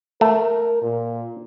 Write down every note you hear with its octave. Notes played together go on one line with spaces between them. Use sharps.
A3 A#4
A#2